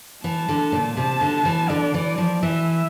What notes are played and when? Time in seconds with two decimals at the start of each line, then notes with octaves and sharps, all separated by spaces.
0.24 E3 A5
0.49 D3
0.72 A#2
0.97 C3 A5
1.21 D3
1.45 E3
1.70 D3 D5
1.94 E3
2.18 F3
2.43 E3 E5